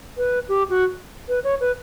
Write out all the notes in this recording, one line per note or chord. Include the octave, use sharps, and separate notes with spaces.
B4
G4
F#4
B4
C#5
B4